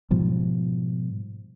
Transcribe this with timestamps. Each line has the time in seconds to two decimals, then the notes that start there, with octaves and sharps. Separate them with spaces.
0.10 G#2 B2 F3 G3